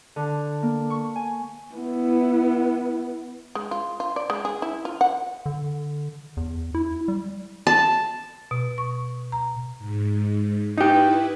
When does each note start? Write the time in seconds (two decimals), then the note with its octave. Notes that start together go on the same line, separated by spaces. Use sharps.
0.16 D3
0.62 A#3
0.90 C#6
1.16 G#5
1.75 B3 E4
3.55 G#3
3.71 F4
4.00 F4
4.16 D5
4.30 G#3
4.45 G#4
4.62 E4
4.85 F4
5.01 F#5
5.46 D3
6.37 E2
6.75 E4
7.08 G3
7.67 A5
8.51 B2
8.78 C#6
9.32 A#5
9.78 G#2
10.78 D#4 E4 G4 B4